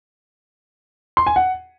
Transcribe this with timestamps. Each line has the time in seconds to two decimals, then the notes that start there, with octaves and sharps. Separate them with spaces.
1.17 C6
1.27 G#5
1.36 F#5